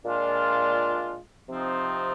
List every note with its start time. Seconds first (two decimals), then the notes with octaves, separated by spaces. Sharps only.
0.05 A#2 G#3 D4 F4
1.48 C3 F3 C4 D#4